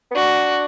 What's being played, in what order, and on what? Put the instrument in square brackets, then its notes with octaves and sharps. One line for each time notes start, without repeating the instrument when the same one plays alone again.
[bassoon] B3
[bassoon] D4 [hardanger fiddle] F#4